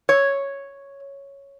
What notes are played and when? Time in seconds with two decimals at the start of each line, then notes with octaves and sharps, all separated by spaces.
0.09 C#5